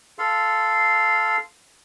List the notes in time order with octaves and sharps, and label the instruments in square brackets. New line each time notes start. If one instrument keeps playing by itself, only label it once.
[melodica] A4 F5 C6